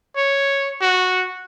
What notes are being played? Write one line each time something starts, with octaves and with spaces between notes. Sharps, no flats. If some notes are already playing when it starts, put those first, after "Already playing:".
C#5
F#4